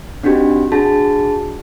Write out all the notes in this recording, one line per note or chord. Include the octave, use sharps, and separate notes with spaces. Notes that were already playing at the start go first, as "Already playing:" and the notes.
C4 D4 D#4 F#4 G4
D4 F#4 G#4 A5